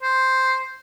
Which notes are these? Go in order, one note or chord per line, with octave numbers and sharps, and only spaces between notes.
C5